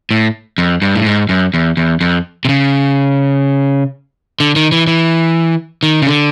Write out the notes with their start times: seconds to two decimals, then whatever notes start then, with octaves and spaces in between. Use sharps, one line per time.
0.11 A2
0.58 F2
0.82 G2
0.95 A2
1.06 G#2
1.29 F#2
1.54 E2
1.77 E2
2.01 F2
2.45 C3
2.49 C#3
4.40 D3
4.56 D#3
4.72 E3
4.87 E3
5.83 D#3
6.02 C#3
6.07 D3